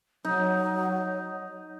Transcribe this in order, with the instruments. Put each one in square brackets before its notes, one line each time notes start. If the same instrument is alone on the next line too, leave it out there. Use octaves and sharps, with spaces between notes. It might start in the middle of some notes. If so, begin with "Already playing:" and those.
[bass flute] F#3 [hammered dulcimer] D#4